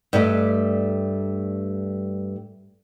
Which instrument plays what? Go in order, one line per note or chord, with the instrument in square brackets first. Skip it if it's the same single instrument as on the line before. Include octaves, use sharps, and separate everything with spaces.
[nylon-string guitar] G2 G3 A3 D5 D#5